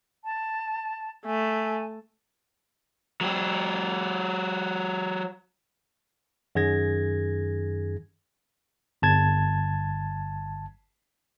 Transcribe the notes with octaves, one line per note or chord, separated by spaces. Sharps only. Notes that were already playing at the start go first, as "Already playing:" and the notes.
A5
A3 G#5
F#3 G4
F#2 D#3 G#4 G#6 A#6
G1 A5 G#6